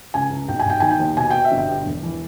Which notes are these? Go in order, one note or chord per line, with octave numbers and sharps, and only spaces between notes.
C#2 G#5
C#2
B1 G5
G#5
B1 G5
D#3 G#5
G5
D#2
B2 G#5
B2 G5
E5
G1
G5
G2
E1
E3